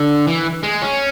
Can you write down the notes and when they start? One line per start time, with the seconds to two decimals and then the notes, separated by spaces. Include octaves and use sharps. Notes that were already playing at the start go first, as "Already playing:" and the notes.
Already playing: D3
0.27 E3
0.63 G#3
0.82 C#4